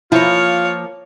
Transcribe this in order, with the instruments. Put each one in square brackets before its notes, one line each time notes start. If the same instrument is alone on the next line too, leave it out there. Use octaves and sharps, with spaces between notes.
[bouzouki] F3 A#3 [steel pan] E4 [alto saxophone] F4 [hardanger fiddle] C#5